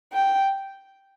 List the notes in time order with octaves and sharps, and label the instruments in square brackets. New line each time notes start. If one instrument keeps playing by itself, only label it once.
[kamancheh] G5